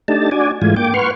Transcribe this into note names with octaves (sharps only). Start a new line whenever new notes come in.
A3 D4 D#4 G4 A5
D4 F#4 D5 G#5
G#2 E3 G#3 A3 F4 G#5
A#3 G5 D6
B4 F#5 C6 C#6 F6